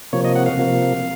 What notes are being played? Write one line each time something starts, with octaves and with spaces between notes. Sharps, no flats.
C3 F3 A#3 C#5
D#5
F#5
F5
C3 F3 A#3